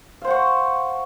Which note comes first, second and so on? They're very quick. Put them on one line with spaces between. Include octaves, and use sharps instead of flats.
F5 C5 F#5 C#6